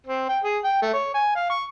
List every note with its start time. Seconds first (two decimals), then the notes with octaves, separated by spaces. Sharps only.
0.06 C4
0.29 G5
0.44 G#4
0.64 G5
0.82 A3
0.93 C#5
1.14 G#5
1.35 F5
1.50 C#6